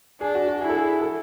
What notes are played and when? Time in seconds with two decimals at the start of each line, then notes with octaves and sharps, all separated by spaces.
0.21 D4 G#4
0.35 F#4
0.48 F#4
0.61 E4 G#4
0.69 A4
0.77 G#4
1.02 A4